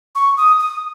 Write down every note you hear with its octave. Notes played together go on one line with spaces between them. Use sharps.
C#6
D#6
D#6